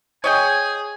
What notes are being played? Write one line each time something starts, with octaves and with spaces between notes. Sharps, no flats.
G#4 C#5 D#5 G5 G#5